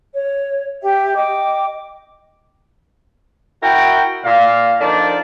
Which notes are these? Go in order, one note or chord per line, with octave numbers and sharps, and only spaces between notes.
C#5
G4 E5 G5
D#5 G5 D6
E4 F#4 A#4 G5
A#2 F5
D3 F3 D4 D#4 A#4 D5